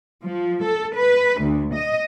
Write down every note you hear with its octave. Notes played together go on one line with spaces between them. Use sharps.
F3
A4
B4
D2
D#5